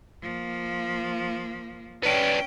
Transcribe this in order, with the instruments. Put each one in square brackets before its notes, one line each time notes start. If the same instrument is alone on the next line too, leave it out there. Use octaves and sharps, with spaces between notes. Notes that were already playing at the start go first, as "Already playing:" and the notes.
[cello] F3 A#3
[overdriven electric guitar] B3 D4 [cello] C#4 G5